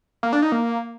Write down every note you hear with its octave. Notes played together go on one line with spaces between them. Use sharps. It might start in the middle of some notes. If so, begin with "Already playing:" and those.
A#3
D4
D#4
A#3